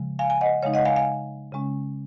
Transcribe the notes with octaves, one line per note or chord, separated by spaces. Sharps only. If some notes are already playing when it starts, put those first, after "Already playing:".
Already playing: C#3 F3 G#3
F5 G#5
G#5
D#5 F#5
C#3 G#3 D#4 C#5 F5
D#5 F#5
F5 G#5
F5 G#5
C#3 G#3 C#4